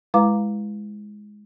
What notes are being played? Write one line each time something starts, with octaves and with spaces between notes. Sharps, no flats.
G#3 E4 B4 F5 A#5 D6